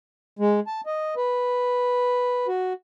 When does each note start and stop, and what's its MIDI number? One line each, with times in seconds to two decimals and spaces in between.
0.39 0.60 56
0.67 0.81 81
0.86 1.15 75
1.16 2.47 71
2.48 2.73 66